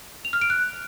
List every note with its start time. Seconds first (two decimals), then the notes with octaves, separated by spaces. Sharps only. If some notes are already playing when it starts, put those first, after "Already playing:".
0.25 F7
0.33 F6
0.41 D7
0.50 F#6